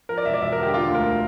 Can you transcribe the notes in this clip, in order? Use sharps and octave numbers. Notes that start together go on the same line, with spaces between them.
F3 A#4
D5
E1 E5
D5
E1 E5
A#4
D3 G4
D3 F4
D2 A#4